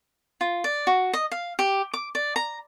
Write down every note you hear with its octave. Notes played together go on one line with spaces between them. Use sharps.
F4
D5
F#4
D#5
F5
G4
D6
D5
A#5